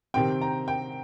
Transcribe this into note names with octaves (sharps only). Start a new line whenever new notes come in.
C3 D#3 C4 G5
A#5
G5